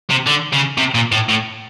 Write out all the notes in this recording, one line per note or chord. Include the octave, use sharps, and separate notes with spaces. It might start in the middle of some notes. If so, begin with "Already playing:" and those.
C3
D3
C#3
C3
A#2
A2
A2